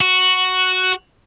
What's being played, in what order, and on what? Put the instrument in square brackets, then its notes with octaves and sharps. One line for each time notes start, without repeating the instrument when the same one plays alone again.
[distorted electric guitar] F#4